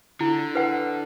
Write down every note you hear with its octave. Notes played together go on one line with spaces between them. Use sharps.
D3 E4
B4 F#5